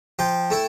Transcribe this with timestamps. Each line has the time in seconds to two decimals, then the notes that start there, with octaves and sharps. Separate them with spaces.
0.19 F3 G5
0.50 A3 E4